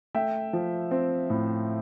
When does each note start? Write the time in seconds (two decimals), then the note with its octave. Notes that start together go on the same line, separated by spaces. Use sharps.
0.15 A3 E5 G5
0.53 F3
0.91 C4
1.30 A2